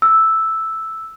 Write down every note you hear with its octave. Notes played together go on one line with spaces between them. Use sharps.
E6